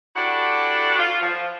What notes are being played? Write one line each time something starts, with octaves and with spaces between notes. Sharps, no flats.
D4 E4 F#4 G4 A4 F#5
F4
F3